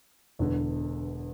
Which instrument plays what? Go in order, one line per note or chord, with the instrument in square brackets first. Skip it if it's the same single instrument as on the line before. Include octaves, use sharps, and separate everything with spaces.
[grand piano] E1 E2 D3